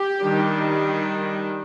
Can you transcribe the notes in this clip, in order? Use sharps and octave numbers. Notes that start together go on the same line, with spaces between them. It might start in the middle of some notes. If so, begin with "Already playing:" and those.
Already playing: G4
D#3 G3 D4